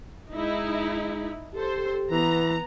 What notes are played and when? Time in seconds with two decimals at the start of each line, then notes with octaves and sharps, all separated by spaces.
0.33 G#3 D#4 E4
1.54 G4 A4 C5
2.11 E3 B3 A#5